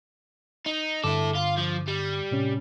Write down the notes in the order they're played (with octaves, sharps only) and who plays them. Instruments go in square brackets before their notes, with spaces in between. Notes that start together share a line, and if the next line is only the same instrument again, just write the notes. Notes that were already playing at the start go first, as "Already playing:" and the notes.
[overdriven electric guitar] D#4
[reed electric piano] G2 D3 D6 [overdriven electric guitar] E4 A4
[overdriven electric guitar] F4
F3
G3
[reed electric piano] A2 C3 C#4